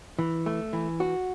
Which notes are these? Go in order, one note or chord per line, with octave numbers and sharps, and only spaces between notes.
E3
A3
E3
F#4